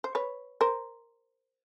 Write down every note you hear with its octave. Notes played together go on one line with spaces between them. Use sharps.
C5
B4 C#5
A#4 C5